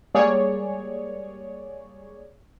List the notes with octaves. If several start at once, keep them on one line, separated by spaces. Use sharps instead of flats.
G3 G#3 A#3 G#4 C#5 D5